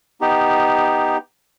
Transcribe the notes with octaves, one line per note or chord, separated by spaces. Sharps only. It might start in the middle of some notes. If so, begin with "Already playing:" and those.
B3 D#4 G4